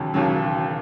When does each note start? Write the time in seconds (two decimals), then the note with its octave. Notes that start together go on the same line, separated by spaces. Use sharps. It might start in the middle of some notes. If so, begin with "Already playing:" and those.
Already playing: E1 D#2 C#3 F#3
0.14 E1 D#2 C#3 F#3